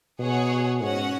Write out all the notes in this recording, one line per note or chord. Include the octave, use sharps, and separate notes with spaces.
B2 G#4 C#5 F#5
G#2 C#4 F#4 C#5 F#5